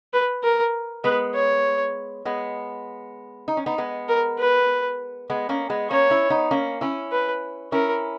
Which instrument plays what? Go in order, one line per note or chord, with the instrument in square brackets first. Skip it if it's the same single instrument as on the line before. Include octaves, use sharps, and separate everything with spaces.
[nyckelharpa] B4
A#4
[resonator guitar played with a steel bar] G#3 B3 [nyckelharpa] B4
[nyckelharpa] C#5
[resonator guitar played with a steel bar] G#3 B3
D#4
C#4
B3 D#4
G#3 B3
[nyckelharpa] A#4
B4
[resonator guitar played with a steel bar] G#3 B3
A#3 C#4
G#3 B3
[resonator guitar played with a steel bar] A#3 C#4 [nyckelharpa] C#5
[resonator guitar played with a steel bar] C#4 E4
B3 D#4
A#3 C#4
C#4 E4
[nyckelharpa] B4
[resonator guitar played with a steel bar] C#4 E4 [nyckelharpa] A#4